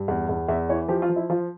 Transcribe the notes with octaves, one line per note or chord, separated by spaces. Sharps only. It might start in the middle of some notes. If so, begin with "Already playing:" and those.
Already playing: G2
E2
E2
E2 E5
E3 C#5
F3 G4
F4
F3
E4
F3 F4